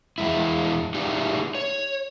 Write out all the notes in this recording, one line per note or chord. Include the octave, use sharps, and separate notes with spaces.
E2 G#3 E4
D#4 G4 G#4 D5 E5
C#5